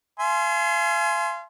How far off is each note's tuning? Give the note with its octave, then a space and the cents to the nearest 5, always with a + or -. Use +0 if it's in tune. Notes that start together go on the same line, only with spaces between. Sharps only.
F5 -35 G#5 +30 C6 +0